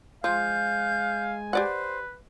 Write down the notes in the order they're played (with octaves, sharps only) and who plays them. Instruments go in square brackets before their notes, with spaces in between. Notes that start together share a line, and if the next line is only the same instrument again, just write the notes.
[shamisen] F3 [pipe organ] G#3 G#5 [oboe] F5 [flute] G6
[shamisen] G4 D5 F#5 [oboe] B4 [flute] C5